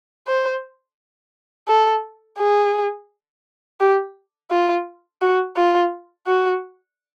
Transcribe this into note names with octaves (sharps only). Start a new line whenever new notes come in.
C5
A4
G#4
G4
F4
F#4
F4
F#4